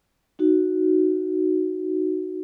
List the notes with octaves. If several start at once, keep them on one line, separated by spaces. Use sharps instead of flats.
D#4 F#4